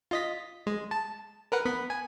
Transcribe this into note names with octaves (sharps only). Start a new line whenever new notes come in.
F4 D#5 B6
G#3
A5
A#4 B4 F#5
B3 B5
G#5